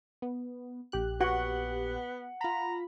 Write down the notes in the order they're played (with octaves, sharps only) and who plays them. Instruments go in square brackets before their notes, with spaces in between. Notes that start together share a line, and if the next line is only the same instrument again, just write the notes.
[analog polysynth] B3
A#1 G4 F#6
[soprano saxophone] B3 [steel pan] F#4 [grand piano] F#5
[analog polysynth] F4 B5 [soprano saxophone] A#5